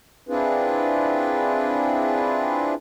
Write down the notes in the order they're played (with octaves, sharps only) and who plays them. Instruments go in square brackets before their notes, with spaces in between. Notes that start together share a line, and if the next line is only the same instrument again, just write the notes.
[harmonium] C4 D4 E4 F4 G#4 B4